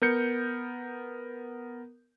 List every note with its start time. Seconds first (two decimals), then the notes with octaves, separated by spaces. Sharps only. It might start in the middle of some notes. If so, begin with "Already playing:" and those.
0.02 B3 A#4 G6 C#7